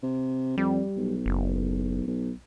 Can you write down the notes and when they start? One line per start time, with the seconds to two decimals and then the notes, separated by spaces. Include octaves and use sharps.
0.03 C3
0.58 F2 G3
0.97 B1
1.26 F#1
2.07 B1